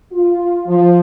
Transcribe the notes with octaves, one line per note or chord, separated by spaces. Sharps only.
F4
F3